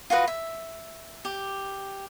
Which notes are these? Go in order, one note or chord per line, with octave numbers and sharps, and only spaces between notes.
F4 F#4 B4 D#5
E5
G4